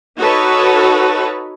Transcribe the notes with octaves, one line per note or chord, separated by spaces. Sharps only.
D#4 F#4 A4 B4 C#5